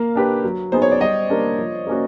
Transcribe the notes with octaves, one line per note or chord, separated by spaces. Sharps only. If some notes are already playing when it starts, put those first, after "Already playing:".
Already playing: A#3 F5
D4 G4 B4
F#3
B3 D#4 G#4 C5
C#5
D5
G3 D#5
A#3 D4 G4 A#4
F3
A#3 C#4 F#4